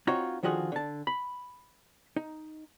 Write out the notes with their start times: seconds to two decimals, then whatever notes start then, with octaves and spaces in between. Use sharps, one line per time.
0.07 C4 D#4 F4 F#4 C#5
0.43 D3 D#3 F3 F4 F#4 G#4
0.72 D3 A5
1.07 B5
2.16 D#4